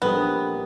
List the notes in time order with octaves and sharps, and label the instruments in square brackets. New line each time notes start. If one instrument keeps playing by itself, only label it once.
[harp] A#1 A#2 G3 C4 D#4 [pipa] B3